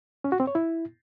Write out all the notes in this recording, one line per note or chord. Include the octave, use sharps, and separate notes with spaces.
C#4
F#4
C4
C#5
E4